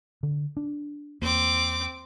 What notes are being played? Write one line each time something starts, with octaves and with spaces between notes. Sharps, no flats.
D3
D4
E2 A#3 C4 D6